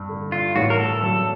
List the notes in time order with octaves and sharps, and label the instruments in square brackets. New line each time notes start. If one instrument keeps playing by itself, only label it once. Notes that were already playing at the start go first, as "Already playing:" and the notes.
Already playing: [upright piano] G2
D3
[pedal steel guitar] F4
[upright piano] A1 [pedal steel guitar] F#4
[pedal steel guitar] A#4
A4
[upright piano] F#3 [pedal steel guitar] A4